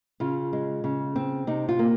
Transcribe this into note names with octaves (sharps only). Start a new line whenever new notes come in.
C#3 F4
G#3
C#3
C4
C3 D#4
F4
A#3